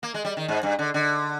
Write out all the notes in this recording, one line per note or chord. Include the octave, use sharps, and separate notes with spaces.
A#3
G#3
G3
D#3
G#2
G2
D3
D3